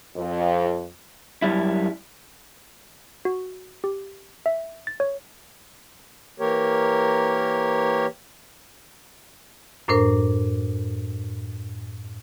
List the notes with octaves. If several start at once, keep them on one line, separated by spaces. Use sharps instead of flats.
F2
F#2 G3 E4
F#4
G4
E5
A6
C#5
E3 A#3 G4 A#4 C#5
F#2 A2 D4 A#4 C5